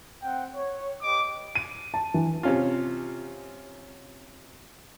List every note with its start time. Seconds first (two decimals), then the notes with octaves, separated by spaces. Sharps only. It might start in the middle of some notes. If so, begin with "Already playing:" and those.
0.23 C4 F#5 G5
0.55 C#5
1.03 G4 B4 D#5 D6
1.55 D#7
1.94 A5
2.14 E3
2.43 C3 C#4 F4